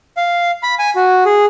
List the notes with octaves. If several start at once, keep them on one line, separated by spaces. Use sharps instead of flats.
F5
B5
G#5
F#4
G#4